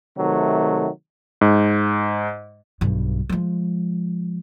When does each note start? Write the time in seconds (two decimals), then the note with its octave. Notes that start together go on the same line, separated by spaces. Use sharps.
0.18 C3 D#3 F#3 A3
1.41 G#2
2.81 B1 G2
3.29 F3 G#3